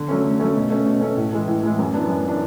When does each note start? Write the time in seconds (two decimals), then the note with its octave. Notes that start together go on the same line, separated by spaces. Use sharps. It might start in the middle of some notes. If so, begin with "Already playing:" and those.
Already playing: D3
0.09 F#3 A3 C#4
0.24 D3
0.39 F#3 A3 C#4
0.55 B2
0.70 A3 C#4
0.86 B2
1.01 A3 C#4
1.16 A2
1.33 E3 G#3
1.48 A2
1.64 E3 G#3
1.79 F#2
1.93 E3 B3 D4
2.09 F#2
2.25 E3 B3 D4